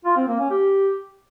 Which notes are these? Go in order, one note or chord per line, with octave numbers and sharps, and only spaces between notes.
F4
C4
A#3
C#4
G4